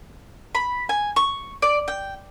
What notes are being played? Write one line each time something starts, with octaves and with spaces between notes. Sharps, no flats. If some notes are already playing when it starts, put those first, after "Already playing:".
B5
G#5
C#6
D5
G5